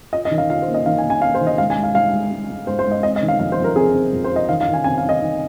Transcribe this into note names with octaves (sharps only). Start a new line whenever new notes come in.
F4 D#5
D#5
D#3
F5
F4 F5
C5
A#3
D#5
D#3 F5
G#5
A#3
G#5
A#3 F5
C5
D#3
D#5
G#3 F5
G#5
G#3
F5
G#2 F5
G#3
G#3
G#3
G#2 C5
C5
G#2
D#5
C4 D#5
D#5
D#3
F5
F2 F5
C5
F2
A#4
C4 G#4
C4
F2
C5
F4 D#5
D#3 F5
F5
D#3
G#5
C4 G#5
F5
D#4
D#5
D#3